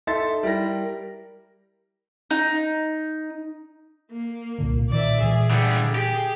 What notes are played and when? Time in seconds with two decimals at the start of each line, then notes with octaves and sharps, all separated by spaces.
0.07 D#4 A4 E5 A5 C6 A6
0.43 G3 E4 A#4 A#6
2.31 D#4
4.12 A#3
4.58 C2 A#2 D3
4.90 A#2 D#3 D5 E5
5.22 A#2 E3 G#3 G#4
5.51 D3 G3
5.95 G4 G#4